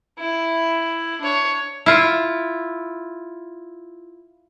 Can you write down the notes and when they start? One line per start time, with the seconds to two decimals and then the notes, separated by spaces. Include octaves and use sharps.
0.19 E4
1.21 D4 C#5
1.86 E4 F4